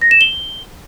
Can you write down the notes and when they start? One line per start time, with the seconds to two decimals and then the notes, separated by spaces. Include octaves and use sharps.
0.01 A#6
0.11 E7
0.21 G7